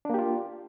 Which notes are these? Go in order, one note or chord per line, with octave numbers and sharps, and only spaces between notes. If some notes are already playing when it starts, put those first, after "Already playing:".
A#3 D4 F4 G4